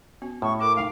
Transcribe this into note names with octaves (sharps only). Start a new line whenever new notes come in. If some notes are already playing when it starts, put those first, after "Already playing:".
B3 C#4 F#4
A2 A3 G#4 C#6
E4 A4 A#4 D6
A3 D#4 F5 G5